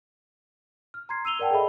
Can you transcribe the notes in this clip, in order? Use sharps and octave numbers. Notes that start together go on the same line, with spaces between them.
F6
A#5 C6 G#6 C7
E6 D#7 F7 G7
A#4 D5 F#5 G5 A5
G#4 A4 D#5 E5 B5